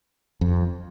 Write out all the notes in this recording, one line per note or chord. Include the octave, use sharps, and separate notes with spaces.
F2